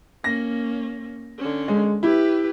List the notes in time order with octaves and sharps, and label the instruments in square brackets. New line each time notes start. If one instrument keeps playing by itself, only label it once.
[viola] A#3 C#4 [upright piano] A#6
[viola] D3 C#4
[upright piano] G#3
[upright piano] E4 [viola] G4 B4